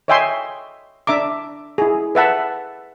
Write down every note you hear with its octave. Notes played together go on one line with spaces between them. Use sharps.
C#5 D#5 E5 G5 G#5 C6
D4 E5 A#5 D6
E4 G#4
B4 E5 F#5 A5